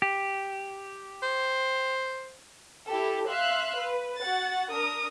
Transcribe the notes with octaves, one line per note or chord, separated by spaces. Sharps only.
G4
C5
E4 G4 A4
E5 F5 C6 E6 F#6
B4
F#4 F#5 A6
D4 A#4 D#6